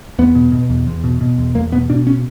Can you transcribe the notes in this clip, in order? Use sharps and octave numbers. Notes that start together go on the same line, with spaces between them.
E2 B3
B2
B2
E2
E2
B2
B2
E2
E2 A#3
B2 B3
B2 D4
C#4